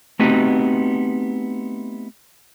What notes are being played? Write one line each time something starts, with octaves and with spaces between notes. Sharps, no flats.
A3 B3 C4 D#4 F#4 G4